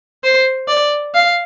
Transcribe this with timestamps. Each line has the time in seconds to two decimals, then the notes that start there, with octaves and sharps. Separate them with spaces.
0.24 C5
0.68 D5
1.14 F5